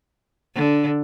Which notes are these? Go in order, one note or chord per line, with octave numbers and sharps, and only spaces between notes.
D3